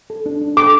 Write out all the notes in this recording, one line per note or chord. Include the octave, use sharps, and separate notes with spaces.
A4
D4
D4
A4 D6